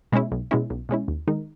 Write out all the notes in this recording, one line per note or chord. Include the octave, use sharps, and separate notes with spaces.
B2 G#3 C#4 E4
B1
B2 G#3 C#4 E4
B1
B2 G#3 C#4 E4
D#2
D#3 G#3 D#4 A#4